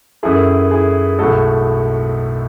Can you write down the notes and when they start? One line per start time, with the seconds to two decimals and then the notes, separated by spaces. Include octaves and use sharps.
0.23 F#2 D#3 A3 E4 G#4
0.71 E4 G#4
1.19 B1 A2 G#3 F#4 A4